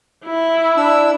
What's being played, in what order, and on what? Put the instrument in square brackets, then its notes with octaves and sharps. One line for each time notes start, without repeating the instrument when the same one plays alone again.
[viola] E4
[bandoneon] D4 E6